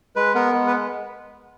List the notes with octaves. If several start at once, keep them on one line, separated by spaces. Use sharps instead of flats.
G#3 B4
B3 A#4
G#3
B4